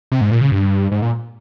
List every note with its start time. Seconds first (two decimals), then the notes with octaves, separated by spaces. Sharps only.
0.12 C3
0.21 G#2
0.31 A#2
0.41 C#3
0.52 G2
0.92 G#2
1.02 A#2